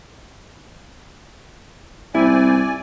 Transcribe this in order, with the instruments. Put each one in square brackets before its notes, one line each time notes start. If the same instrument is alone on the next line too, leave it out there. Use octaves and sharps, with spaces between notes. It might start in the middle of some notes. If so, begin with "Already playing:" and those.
[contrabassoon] C2 [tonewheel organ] C4 [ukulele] E4 [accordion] D5 G#5